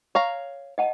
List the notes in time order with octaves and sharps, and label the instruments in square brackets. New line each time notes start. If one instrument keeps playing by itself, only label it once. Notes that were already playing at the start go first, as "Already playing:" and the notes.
[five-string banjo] C#5 F5 A#5
[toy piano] D#5 F#5 A5